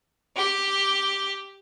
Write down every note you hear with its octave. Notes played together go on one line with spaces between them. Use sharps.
G4